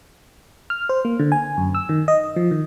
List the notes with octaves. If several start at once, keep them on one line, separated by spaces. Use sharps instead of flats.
F6
C5
A#3
D3
G#5
F#2
E6
D#3
D#5
F3
D#3